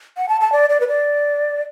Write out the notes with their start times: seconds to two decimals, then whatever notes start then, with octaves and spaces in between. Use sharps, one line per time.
0.18 F#5
0.29 A5
0.41 A5
0.52 D5
0.70 D5
0.80 B4
0.88 D5